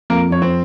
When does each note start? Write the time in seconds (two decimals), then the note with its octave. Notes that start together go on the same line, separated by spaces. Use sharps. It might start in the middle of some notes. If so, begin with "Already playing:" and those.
0.10 F2 A#3 A#4
0.31 F2 C#5
0.42 C4 C5